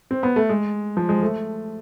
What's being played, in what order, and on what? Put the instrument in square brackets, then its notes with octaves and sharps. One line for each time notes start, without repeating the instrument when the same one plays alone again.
[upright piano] C4
B3
A3
G#3
F3
G#3
A3